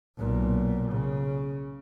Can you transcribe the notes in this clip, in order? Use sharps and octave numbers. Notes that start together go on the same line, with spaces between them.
B1 A#2
C#3